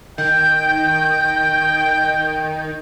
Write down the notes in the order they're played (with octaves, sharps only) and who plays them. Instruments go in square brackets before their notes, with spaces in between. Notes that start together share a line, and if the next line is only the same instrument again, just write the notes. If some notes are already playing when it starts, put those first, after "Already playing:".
[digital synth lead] D#3 [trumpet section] G5 [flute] G6